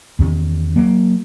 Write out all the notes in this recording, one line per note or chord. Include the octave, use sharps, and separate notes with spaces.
E2 D#3 C#4
F#3 A#3